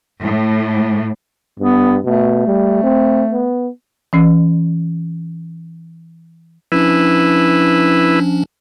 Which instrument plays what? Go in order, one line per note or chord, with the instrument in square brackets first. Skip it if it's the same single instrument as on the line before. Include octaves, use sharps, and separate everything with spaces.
[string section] A2
[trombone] G2 [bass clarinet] B3
[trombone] B2 [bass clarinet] A3
[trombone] G3
C4
B3
[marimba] E3 C#4
[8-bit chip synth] F3 C#4 D4 [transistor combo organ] E4 B4